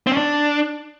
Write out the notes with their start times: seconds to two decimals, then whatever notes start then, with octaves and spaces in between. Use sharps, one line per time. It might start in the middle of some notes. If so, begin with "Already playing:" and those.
0.07 C4
0.12 C#4
0.17 D4